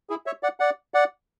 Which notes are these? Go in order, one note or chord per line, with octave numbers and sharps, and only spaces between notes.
E4 G#4
C#5 E5
D5 F#5
D5 F#5
D5 F#5